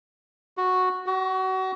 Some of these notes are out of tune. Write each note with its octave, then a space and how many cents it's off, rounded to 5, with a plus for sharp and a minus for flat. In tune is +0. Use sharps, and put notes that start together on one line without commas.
F#4 -5
F#4 +30